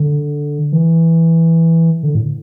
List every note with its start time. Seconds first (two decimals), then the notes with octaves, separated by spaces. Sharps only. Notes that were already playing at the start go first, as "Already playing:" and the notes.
Already playing: D3
0.72 E3
2.03 D3
2.15 A2